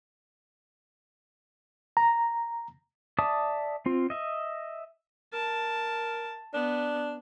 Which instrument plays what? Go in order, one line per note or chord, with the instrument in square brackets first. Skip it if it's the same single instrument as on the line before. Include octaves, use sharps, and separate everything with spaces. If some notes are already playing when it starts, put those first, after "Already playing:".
[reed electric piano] A#5
[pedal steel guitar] D5 E5 A5 D#6
C4 F4
D#5 E5
[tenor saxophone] A#4 [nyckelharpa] A5
[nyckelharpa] B3 [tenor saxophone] D4